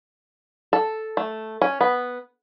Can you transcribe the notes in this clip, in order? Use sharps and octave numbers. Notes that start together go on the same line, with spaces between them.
A4
A3
C#4
B3